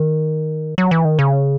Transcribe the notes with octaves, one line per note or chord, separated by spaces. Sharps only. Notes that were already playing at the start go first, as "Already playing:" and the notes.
Already playing: D#3
F#3
E3
D#3
C#3